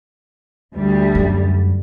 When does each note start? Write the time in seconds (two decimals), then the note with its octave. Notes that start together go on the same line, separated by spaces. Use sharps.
0.75 D2 G3
1.15 F#2